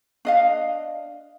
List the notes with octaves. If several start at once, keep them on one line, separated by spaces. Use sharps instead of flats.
D4 D#5 F5